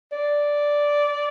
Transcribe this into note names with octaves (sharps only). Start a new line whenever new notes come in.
D5